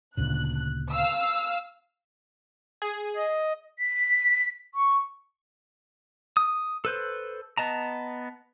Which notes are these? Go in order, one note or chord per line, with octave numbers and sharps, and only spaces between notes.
D2 A#2 C#3 F#6
F5 E6
G#4
D#5
B6
C#6
D#6
A4 B4 C5
B3 D#5 A5 A#5